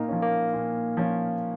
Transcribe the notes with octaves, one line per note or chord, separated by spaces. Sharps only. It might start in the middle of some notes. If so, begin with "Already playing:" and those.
Already playing: A#2 A#3 D#4
F3 C#4
A#3
A#2
F3 C#4